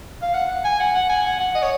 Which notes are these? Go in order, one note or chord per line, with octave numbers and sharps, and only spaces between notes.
F5
F#5
G#5
F#5
F#5
G#5
F#5
F#5
D#5
C#5